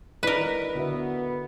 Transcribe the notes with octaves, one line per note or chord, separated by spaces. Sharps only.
E4 A#4 B4 D5 D#5
D3 B3 F#4 E5